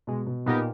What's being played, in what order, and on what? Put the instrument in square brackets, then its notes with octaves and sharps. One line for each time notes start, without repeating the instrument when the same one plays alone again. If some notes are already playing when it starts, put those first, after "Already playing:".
[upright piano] B2 [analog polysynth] G#3
[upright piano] B2
[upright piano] A#2 [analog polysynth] B3 D#4 G4 A#4